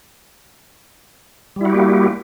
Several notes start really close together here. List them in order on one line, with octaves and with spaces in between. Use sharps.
G3 E4 F#4 G4 A#3